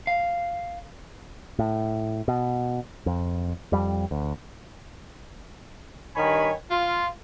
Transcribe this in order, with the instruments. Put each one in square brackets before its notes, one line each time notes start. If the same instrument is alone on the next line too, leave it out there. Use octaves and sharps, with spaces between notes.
[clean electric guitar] F5
[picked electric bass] A2
B2
F2
F2 G3
D2
[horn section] G2 D#3 C#5 G#5 B5
F4